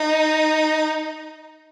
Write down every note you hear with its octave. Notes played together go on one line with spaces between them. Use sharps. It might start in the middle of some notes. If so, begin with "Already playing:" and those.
Already playing: D#4